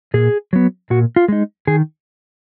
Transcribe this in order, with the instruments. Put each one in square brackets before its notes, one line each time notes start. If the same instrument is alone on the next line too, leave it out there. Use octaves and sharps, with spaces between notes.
[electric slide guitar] A#2 G#4
F#3 B3
A#2 F#4
F4
G#3 D#4
D#3 G#4